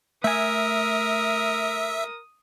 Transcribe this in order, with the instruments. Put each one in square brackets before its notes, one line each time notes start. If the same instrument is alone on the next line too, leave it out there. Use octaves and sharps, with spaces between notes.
[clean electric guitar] A3 G#5 [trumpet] A#4 [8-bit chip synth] E5 [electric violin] D#6